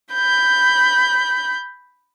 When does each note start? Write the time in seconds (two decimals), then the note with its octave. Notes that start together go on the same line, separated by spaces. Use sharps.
0.13 B5 G6